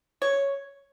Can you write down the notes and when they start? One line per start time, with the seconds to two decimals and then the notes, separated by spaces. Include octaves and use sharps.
0.22 C#5